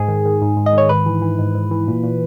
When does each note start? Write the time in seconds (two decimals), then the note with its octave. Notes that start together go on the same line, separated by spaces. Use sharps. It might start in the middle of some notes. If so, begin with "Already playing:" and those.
Already playing: G#2 G#4
0.08 D#3
0.25 D#3
0.42 G#2
0.57 G#2
0.66 D#5
0.73 D#3 C#5
0.89 G#2 B4
1.06 E3
1.22 E3
1.39 G#2
1.55 G#2
1.71 E3
1.88 A#2
2.03 A#2